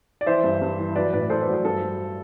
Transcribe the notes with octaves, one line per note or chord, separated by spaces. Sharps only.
D5
E3 C5 E5
G2
G2
E3
F#3 B4 D5
A2 B4 D5
A2 A4 C5
B4 D5
F#3
A4 C5
G2 A4 C5
F#3